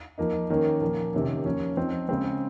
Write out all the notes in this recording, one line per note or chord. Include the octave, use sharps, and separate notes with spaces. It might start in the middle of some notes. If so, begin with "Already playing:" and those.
F3 A#3 D#4
D#3 A#3 C#4
A#2 F3 A#3
C3 D#3 A#3 C#4
F3 A#3 C#4
F3 C4 D#4
C#3 G#3 C4